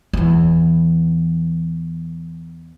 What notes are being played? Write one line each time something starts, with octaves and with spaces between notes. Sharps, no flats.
E2 E3